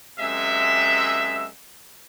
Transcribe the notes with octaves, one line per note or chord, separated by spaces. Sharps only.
F#2 C3 G#3 E5